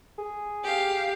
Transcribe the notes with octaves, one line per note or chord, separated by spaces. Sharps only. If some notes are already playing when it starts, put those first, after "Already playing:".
G#4
G4 F5